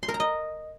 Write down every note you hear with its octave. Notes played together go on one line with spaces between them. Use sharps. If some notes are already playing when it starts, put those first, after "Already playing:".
C6
A#4
A#5
D#5